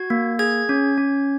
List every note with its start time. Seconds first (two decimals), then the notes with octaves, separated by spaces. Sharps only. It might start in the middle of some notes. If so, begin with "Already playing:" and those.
Already playing: F#4 G#6
0.10 A#3
0.39 G#4 G#6
0.69 C#4
0.98 C#4